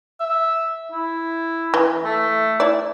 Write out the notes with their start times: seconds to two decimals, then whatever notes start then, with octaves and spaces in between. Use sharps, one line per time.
0.20 E5
0.92 E4
1.74 E3
2.04 A3
2.60 E4 D5